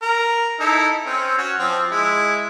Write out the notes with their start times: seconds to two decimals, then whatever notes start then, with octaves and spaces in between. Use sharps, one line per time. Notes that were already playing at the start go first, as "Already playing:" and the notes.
0.02 A#4
0.60 D#4 E4 A4
1.06 C4 C#4
1.38 C#4 F#4
1.59 F3 C4
1.91 G#3 E4